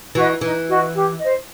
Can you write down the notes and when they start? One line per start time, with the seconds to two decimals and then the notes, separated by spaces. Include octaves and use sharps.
0.15 E3 F#4 B4 D#5
0.41 E3 D#4
0.67 F#4 B4 D#5
0.93 G4
1.18 C5 D#5